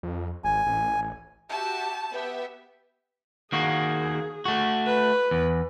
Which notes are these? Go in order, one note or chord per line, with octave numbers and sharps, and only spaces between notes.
F2
G#1 G#5
A1
F#4 G4 E5 A5
B3 G4 E5
D#3 A#3 F#4 G#4
A3 F#4
B4
E2